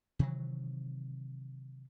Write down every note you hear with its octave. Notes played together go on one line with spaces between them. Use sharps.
C3 D#3 E3 F#3